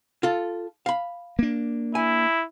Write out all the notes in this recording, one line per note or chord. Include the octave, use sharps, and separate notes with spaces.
F4 A4
F5 B5
A#3 D4
E4 G#5